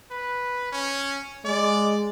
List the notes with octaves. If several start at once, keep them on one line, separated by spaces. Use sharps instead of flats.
B4
C#4
G#3 D5